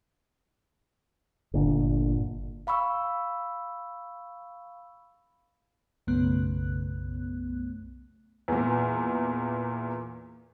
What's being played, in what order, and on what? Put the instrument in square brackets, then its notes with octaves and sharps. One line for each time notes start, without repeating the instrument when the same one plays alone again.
[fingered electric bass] G1 A#2 D3
[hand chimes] F5 B5 C#6 E6
[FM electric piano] B1 F#2 C#3 A3 B3 F#6
[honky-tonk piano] E2 A#2